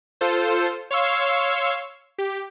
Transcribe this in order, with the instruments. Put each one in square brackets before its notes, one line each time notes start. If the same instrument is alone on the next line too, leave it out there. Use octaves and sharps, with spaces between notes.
[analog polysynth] F4 A4 C5
C#5 F5 C6 C#6 E6 C7
G4